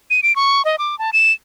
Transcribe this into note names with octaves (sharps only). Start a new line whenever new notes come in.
D#7
D7
C#6
D#5
D6
A5
E7